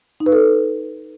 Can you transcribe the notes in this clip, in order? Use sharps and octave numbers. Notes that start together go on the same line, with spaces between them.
D#4
B4
A4